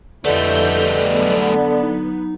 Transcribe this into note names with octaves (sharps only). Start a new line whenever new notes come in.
F2 D3 G3 A3 E4 B4 D#5 G6
F#3 B3
D#4